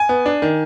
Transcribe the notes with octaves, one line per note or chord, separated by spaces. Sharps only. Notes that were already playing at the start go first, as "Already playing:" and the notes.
Already playing: G#5
B3
D4
D#3